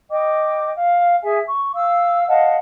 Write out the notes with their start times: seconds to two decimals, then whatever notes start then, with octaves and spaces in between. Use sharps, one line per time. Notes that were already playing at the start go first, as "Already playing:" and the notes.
0.10 D#5 G5 D6
0.77 F5
1.21 G#4 E5 G#5
1.45 C#6
1.74 F5 E6
2.27 D#5 F5 F#5 A5